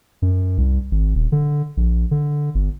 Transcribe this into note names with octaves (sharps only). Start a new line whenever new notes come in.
F#2
C2
G#1
D#1
D3
A#1
D3
G1